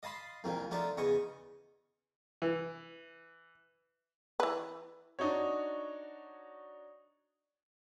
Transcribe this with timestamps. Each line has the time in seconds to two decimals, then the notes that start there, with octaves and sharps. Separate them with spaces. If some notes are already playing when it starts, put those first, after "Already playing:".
0.03 D#5 F5 A5 B5 C6
0.44 C2 F2 A#2 D#3
0.71 F3 A3 D4 D#4 F4
0.97 E2 C#3 D#5 C#6
2.42 E3
4.40 E3 B4
5.19 D4 D#4 F#4 C#5